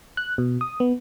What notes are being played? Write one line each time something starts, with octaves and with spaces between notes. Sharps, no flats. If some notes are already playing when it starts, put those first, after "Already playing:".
F#6
B2
D#6
B3